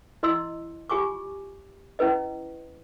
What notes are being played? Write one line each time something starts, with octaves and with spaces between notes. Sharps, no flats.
E4 D#5 C6 E6
F4 G4 G#5 C#6 D6
C#4 E4 B4 D#5